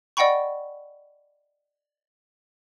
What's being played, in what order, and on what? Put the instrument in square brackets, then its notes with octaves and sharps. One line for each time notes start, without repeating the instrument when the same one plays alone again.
[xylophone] D5 D#5 F#5 G5 B5 C#6